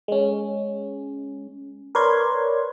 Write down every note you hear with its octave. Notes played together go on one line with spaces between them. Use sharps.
G#3 C#4
A#4 B4 C#5 D5 C6 G#6